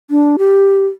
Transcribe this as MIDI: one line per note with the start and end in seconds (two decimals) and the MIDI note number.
0.10 0.36 62
0.38 0.85 67